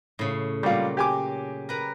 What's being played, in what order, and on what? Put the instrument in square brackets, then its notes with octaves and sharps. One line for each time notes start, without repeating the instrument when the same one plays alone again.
[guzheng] A2 C#3
[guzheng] A#2 F#3 [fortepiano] G3 F4
[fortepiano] G4 G#5 D6
[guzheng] A#4 B4 A#5